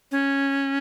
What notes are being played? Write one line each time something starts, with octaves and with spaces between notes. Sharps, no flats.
C#4